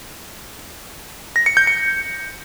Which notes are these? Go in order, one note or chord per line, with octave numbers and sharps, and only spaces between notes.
A#6
C#7
G6
C#7